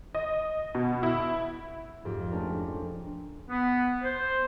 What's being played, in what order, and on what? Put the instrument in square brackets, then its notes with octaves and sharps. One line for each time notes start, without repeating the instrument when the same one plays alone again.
[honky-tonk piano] D#5
B2
E4
[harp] F2 G#2 C4 G4
G#3 A3 C#4 D4 A#4
[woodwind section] B3
C5